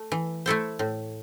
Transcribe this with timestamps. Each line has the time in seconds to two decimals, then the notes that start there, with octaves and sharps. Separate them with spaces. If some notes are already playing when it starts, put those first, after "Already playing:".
Already playing: A3
0.12 E3
0.46 A3 E4 A4 C5
0.79 A2